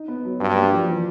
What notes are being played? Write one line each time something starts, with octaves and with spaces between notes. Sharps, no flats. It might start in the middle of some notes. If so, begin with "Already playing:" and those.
Already playing: D#4
B3
F#3
G2 D4
A#3
F3
E3